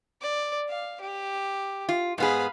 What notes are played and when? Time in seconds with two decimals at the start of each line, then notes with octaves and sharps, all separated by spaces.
0.22 D5
0.69 F5
1.01 G4
1.89 F4
2.18 G#2 B3 G#4 F5 B5